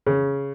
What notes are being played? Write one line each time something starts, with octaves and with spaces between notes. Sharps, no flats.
C#3